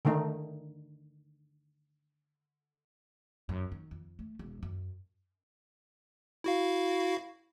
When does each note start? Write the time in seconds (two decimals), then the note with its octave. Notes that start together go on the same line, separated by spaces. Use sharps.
0.05 D3 D#3 A3 D#4
3.49 F#2
3.72 D#3
3.91 F2
4.19 A3
4.39 E1
4.63 F#2
6.44 E4 F#4 F5